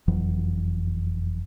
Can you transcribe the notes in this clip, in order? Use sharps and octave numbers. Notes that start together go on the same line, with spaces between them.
F#1 F2 E3 F#3